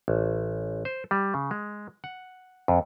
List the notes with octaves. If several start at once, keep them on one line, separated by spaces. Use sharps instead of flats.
A1
C5
G3
C#3
G#3
F#5
F2